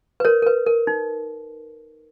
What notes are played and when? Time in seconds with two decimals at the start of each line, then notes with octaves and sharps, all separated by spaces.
0.20 B4
0.25 A#4 C#5
0.42 A#4
0.46 B4
0.66 A#4
0.87 D#4